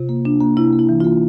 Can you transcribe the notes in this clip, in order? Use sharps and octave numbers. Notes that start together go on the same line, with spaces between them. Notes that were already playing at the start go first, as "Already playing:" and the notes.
Already playing: C3 F4
A#3
D4
A#3
C3 E4
A#3
E4
E3
A#3 F4